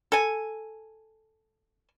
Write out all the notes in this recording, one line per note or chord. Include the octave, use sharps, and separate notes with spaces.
A4 G#5